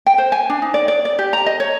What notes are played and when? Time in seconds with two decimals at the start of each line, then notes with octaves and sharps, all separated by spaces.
0.07 G5
0.18 C5
0.32 G#5
0.50 D4
0.62 D#4
0.74 D5
0.88 D5
1.05 D5
1.19 G4
1.33 A#5
1.46 D#5
1.60 C#5